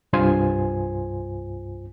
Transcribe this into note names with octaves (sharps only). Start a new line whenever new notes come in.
C2 G2 F4 C5 G#5